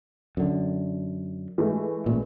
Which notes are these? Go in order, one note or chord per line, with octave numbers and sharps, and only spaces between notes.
F#2 D3
E3 G#3 A3
A1 A#2